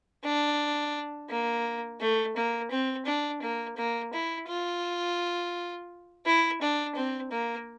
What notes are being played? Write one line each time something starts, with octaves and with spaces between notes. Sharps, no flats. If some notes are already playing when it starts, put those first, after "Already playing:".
D4
A#3
A3
A#3
C4
D4
A#3
A#3
E4
F4
E4
D4
C4
A#3